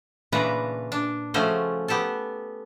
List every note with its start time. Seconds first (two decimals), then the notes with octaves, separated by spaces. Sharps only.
0.32 A#2 C#3 E3 D4 B4 A#5
0.92 D4
1.34 C#3 F3 A3 C#4 F#4 C5
1.88 B3 G4 A4 A5